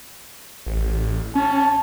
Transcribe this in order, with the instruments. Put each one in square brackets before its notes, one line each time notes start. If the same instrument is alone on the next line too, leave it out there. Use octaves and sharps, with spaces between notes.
[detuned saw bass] A1
[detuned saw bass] C#4 [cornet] A5